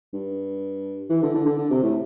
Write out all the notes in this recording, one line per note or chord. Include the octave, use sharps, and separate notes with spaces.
G2
E3
D3
D3
D3
D3
C3
A2